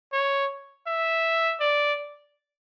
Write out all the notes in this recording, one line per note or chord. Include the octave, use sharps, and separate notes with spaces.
C#5
E5
D5